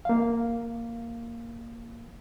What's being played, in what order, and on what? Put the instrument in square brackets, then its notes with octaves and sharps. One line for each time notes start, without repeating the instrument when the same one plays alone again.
[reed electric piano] A#3 F5